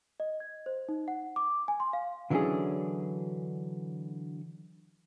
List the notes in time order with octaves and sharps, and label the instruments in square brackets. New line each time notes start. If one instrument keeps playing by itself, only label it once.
[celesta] D#5
G#6
C5
D#4
F#5
D6
G#5
C6
F5
[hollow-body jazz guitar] D3 E3 F#3 C#4 D4 G#4